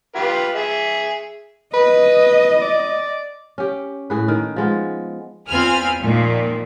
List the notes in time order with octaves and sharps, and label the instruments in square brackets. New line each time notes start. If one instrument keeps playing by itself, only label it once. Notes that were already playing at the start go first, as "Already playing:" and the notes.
[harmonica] F4 G4 B4
G#4 E5
[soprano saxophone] B4 [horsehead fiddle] D#5
[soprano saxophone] D5
[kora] C#4 G4
A2 G#4 B4
D#3
F3 G#3 B3
[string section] E2 C4 F4 G#5 B5 F6
A#2 D#3 F3